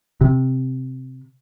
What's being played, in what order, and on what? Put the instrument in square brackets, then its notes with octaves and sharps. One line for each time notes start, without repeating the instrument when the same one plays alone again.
[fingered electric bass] C3